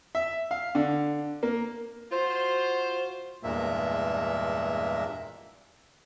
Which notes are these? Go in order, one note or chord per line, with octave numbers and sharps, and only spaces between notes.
E5
F5
D3
A#3
F4 F#4 C5
E2 G2 A#2 G#3 A#3 E5